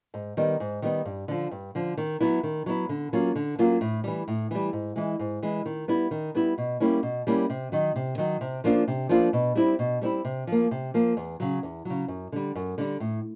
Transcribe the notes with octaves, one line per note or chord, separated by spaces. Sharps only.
G#2
D#3 G3 B3
G#2
D#3 G3 B3
G2
D3 F3
G2
D3 F3
D#3
F#3 B3 E4
D#3
F#3 B3 E4
D3
F#3 A#3 C#4 F4
D3
F#3 A#3 C#4 F4
A2
E3 G3
A2
E3 G3
G#2
E3 G#3
G#2
E3 G#3
D#3
G3 B3 E4
D#3
G3 B3 E4
B2
G3 A#3 C#4 E4
B2
G3 A#3 C#4 E4
C3
D#3 F#3
C3
D#3 F#3
C3
F3 A#3 D4 F4
C3
F3 A#3 D4 F4
B2
G3 C4 E4
B2
G3 C4 E4
C3
F3 A#3
C3
F3 A#3
E2
C#3 F#3
E2
C#3 F#3
F#2
D3 G3
F#2
D3 G3
A2